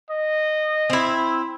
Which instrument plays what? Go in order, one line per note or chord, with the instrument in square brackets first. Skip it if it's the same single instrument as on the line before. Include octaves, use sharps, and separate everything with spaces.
[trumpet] D#5
[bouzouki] C4 E4